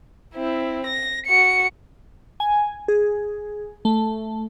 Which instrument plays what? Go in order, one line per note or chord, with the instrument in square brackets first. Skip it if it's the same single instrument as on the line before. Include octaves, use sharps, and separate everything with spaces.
[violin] C4 E4
A#6
F#4 C#7
[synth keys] G#5
G#4
A3